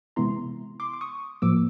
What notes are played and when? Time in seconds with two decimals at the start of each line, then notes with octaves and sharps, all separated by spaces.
0.16 C3 E3 G#3 B3 E4 A#5 C6
0.80 C6 D6
0.93 D6
1.01 C#6 D#6
1.42 A2 F3 A#3 D6 E6